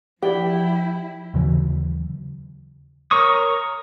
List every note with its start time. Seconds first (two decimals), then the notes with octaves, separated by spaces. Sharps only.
0.22 F3 E4 G4 D5 G5
1.34 D#2 C#3 E3 F#3
3.11 A#4 C#5 C#6 D#6